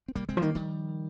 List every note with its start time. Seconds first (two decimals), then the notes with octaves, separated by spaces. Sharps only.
0.08 C4
0.15 C3 G3 A#3
0.29 C3 G#3 C4
0.37 F3
0.42 D#3 G3 A#3
0.55 D#3 F3 G3